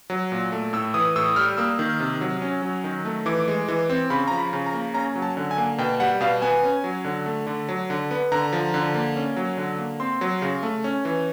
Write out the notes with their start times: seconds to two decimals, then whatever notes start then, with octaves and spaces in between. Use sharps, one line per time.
0.10 F#3
0.32 A#2
0.52 A3
0.73 A2 E6
0.94 E3 D#6
1.16 A2 E6
1.36 G3 F6
1.58 A#3 E6
1.79 D#3
2.00 C3
2.21 F#3
2.42 C#4
2.62 F#3
2.84 D#3
3.05 A3
3.26 E3 D6
3.48 G#3
3.68 E3
3.90 C4
4.10 C#3 B5
4.27 F3 A#5
4.38 B5
4.53 C#3
4.66 A#5
4.74 A#3
4.94 C#4 A#5
5.15 F#3
5.22 A5
5.37 D3
5.51 G#5
5.58 A#3
5.78 B2 G5
6.00 G3 F#5
6.21 B2 F5
6.42 B3 G#5
6.63 C#4
6.84 F#3
7.05 D3
7.26 A3
7.47 D3
7.69 F#3
7.90 D3
8.11 B3
8.32 D3 A#5
8.53 F3
8.74 D3
8.95 A#3
9.16 C#4
9.36 F#3
9.57 D3
9.78 A#3
10.00 C4 C6
10.21 F#3
10.42 C#3
10.63 A3
10.84 C#4
11.05 E3